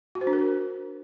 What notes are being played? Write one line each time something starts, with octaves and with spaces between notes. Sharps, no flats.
F#4
C5
D4
A#4